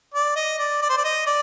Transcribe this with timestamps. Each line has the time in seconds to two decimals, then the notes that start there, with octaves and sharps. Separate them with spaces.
0.14 D5
0.36 D#5
0.59 D5
0.82 D5
0.90 C5
0.98 D5
1.04 D#5
1.27 D5